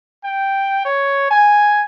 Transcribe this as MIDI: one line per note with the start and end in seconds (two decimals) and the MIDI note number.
0.24 0.85 79
0.85 1.28 73
1.31 1.82 80